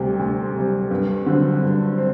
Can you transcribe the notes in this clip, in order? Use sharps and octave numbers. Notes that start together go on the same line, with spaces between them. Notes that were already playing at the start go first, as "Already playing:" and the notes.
Already playing: D2 C3 G3 G5
D2
C3 G3
G2
D3 F#3 C4
G2
C4